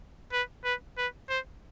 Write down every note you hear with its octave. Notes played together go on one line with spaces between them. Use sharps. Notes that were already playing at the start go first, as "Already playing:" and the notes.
B4
B4
B4
C5